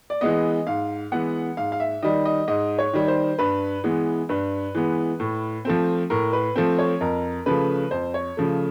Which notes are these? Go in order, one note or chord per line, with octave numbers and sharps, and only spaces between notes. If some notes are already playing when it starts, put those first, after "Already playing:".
D5
E3 G#3 B3 D#5
G#2 F5
E3 G#3 B3 F#5
G#2 F5
F5
E5
D#3 G3 D#5
D#5
G#2 D#5
C#5
D#3 G3
C5
G2 B4
E3 G#3 B3
G2 B4
E3 G#3 B3
A2
F3 A3 C4
A2 A#4
B4
F3 A3 C4
C#5
F2 A#4
C#3 F3 A3 B4
F2 C5
C#5
C#3 F3 A3